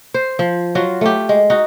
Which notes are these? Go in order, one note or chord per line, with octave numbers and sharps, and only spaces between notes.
C5
F3
F#3 F4 F#4
A3 G4
G#3
D#4 F#4